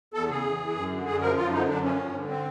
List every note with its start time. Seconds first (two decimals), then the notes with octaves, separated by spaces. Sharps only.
0.14 E2 A4
0.29 C#3 G#4
0.44 E2
0.60 E3
0.76 F#2
0.90 D3
1.06 F#2 G#4
1.21 F3 A#4
1.37 F#2 F4
1.52 D3 D#4
1.68 F#2 D4
1.83 F3 C#4
1.99 G2
2.13 D3
2.29 C4